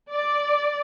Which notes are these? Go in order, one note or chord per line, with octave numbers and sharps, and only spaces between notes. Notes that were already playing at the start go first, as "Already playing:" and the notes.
D5